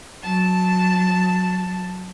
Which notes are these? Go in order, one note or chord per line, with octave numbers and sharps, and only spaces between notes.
F#3 A5